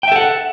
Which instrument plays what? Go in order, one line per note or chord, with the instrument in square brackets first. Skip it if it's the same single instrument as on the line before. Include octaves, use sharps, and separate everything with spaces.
[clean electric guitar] G5
E5
A4
F#5